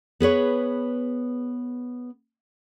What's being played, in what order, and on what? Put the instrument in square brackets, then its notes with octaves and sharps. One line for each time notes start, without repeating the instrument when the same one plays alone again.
[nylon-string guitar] B3 G#4 B4 C#5